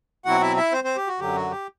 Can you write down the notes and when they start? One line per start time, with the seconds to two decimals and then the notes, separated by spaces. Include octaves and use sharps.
0.25 B2 F#3 C4 E4 F#4 F#5
0.41 E4 E5
0.56 E4 E5
0.72 C4 C5
0.84 C4 C5
0.96 G4
1.08 F#4
1.20 F#2 D3 F#3 G4
1.35 F#4
1.51 G4